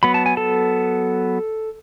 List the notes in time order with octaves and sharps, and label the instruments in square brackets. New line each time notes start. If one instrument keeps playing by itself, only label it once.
[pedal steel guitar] F#3 B3 B5
A5
G#5
A4 A5